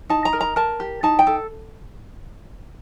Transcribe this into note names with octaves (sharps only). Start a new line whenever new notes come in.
D#4 A5
A#5
A#4
A#5
A#4 A5
G4
D#4 A5
G5
A4